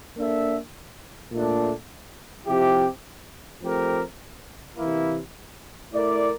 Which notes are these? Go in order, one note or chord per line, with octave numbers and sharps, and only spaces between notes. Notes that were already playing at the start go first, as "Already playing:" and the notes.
A#3 D4 A4 E5
A#2 A3 D4
C3 F3 C4 E4 G4
F3 A3 C4 G4 A#4
C3 E3 A#3 E4
A3 E4 A#4 D5